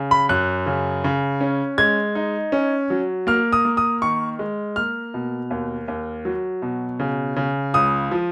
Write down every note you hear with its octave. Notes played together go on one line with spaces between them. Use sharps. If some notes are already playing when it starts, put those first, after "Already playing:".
Already playing: C#3
B5
F#2 F#6
C#3
C#3
C#4
G#3 G#6
D#4
C#4
F#3
A#3 F6
D#6
A#3
D#6
D#3 C#6
G#3
A#3 F6
B2
D#2
D#2
F#3
B2
C#3
C#3
C#2 D#6
F3